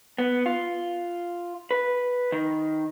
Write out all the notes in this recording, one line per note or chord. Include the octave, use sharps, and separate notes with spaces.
B3
F4
B4
D#3